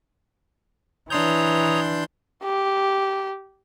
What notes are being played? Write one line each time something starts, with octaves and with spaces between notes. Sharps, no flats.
E3 D4 C#5 A#5 C6 D#6 G6
G4